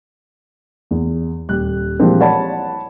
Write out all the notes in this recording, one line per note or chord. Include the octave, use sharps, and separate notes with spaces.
E2
D#1 G3 F#6
A#2 E3 F3 G3 G#3 C4
C#5 D5 F#5 A5 B5